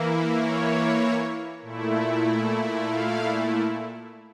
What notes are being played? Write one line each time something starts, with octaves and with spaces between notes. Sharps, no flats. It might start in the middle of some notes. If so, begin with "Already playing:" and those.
Already playing: E3 A#3 E4
C#5
A#2 A3 E4
F5